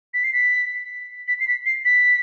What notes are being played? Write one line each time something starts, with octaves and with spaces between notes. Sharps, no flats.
B6
C7
B6
B6
C7
B6
C7
B6